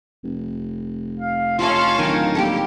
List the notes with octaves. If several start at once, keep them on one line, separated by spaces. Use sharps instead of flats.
F1
F5
C#4 F4 A4 D#5 F5 C6
D1 D#3 A#4 G#5
G3 A#3 G4 A4